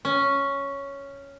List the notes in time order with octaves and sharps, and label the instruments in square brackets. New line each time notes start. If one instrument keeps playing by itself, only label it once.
[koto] C#4